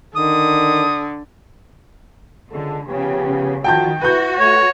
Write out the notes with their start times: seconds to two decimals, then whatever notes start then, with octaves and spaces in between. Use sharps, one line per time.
0.16 D3 D#3 D#6
2.52 C#2 D3 G#3 A4
2.87 C#3 F3 B3 G4
3.64 D#3 F3 F4 F#4 G5 A5 G6
4.02 E4 F#4 B4 G6
4.39 A3 C#5